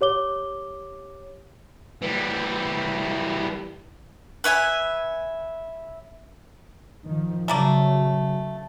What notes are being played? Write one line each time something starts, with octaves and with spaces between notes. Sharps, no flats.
G4 C#5 D6 G7
E3 G3
B4 C#5 E5 G#5
D#3 F3
C#3 F#3 A3 A#3 D5